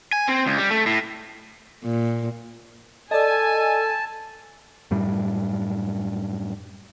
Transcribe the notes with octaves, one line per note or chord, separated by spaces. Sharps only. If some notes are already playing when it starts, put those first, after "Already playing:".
G#5
C4
C#2
G3
A3
A2
A#2
A4 D5 D#5 G#5 A5
F#2 A2 G3